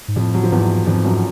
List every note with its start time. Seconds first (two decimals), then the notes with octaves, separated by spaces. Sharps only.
0.08 G#2
0.16 F2 A2 F3
0.34 F#3
0.43 F3
0.52 E2 G#2 E3
0.87 F2 G#2 F3
1.05 F#2 F#3